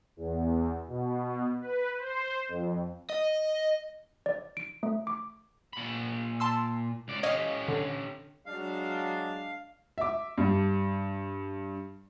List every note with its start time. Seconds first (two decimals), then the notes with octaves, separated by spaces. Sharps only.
0.17 E2
0.87 B2
1.61 B4
1.98 C5
2.49 F2
3.10 D#5
4.26 D5
4.57 D7
4.83 A3
5.07 D6
5.73 A#2 B5
6.40 A5 C6 E6
7.08 C#2 D5
7.23 C#4 G4 C#5 D#5 F5
7.68 D3
8.46 F#3 G#3 D4 F5
9.98 E5 D6
10.38 G2